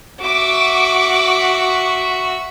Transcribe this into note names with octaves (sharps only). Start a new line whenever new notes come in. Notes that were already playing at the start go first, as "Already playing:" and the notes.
F#4 E5 D6